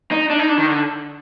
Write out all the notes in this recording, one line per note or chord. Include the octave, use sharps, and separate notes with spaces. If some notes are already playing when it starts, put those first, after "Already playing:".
D#4
D4
D#4
D4
D#3
D3